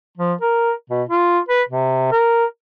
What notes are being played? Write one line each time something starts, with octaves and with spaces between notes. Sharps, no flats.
F3
A#4
B2
F4
B4
C3
A#4